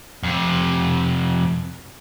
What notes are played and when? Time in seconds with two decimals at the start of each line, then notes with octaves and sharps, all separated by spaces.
0.23 F2 C3